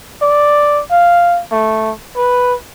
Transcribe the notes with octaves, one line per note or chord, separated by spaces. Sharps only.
D5
F5
A3
B4